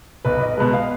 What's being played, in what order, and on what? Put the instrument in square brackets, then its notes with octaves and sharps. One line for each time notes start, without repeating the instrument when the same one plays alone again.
[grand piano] B1 [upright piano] B4
[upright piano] D#5
[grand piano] B2 G#3 [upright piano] B4
[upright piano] F5